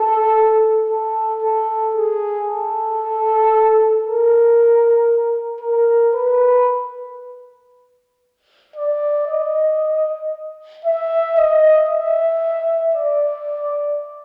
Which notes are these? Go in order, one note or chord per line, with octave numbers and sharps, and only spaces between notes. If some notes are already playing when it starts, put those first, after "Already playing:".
Already playing: A4
A4
A4
G#4
A4
A#4
A#4
B4
D5
D#5
E5
D#5
E5
D5